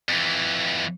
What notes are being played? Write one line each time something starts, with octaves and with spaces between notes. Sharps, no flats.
F2 E3